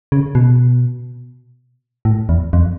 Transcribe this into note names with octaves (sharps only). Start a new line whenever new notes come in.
C#3
B2
A2
E2
F2